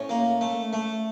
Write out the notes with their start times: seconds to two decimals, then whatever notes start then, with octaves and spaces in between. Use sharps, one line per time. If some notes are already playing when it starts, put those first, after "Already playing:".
Already playing: A2 C#4
0.09 A#3
0.41 A3
0.73 A3